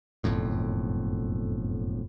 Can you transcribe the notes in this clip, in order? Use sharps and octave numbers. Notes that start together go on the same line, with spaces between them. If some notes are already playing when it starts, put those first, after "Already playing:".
F#1 B1 F2 A2